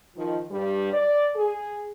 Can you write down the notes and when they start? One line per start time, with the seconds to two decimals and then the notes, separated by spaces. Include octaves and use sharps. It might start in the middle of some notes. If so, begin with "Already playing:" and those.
0.16 D#3 F3
0.51 G2 G3
0.93 D5
1.36 G#4